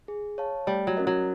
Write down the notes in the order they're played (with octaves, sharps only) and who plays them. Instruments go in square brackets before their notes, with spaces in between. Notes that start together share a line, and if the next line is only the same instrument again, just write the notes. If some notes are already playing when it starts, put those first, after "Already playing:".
[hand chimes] G#4
C#5 F5 A5
[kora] G3 [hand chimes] A3
[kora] F#3
[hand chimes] C#4 F#4 A#4 D#5
[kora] F#3